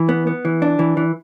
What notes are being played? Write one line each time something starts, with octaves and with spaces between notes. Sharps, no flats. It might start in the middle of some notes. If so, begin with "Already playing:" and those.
Already playing: E3
B3
B3
E3
D4
E3
E3